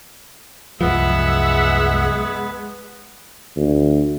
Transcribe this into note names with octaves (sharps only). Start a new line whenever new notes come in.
C2 F#2 F3 G#3 B3 E5 F#5
D2